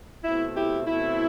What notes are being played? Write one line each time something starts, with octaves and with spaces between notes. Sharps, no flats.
B2 A3 C4 E4
E4 G4
B2 A3 C4 E4